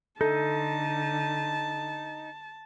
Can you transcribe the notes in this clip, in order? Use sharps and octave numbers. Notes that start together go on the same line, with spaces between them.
D3 D#4 A4 A5